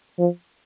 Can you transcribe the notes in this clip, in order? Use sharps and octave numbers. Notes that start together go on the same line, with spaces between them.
F3